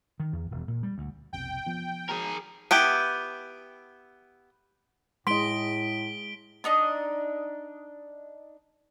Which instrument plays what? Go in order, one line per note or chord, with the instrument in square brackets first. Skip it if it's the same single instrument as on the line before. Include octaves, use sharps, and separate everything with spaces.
[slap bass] D#3
E2
E1
A#2
G3
D2
[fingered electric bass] F1 B1 C3 [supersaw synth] G5
[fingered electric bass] F3 B3
[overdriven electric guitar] G#4 A#4
[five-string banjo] B3 E4 G4
[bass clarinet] A2 [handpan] G#3 D#5 [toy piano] C6 [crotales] B6 D7 G7
[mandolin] D4 D#4 D#5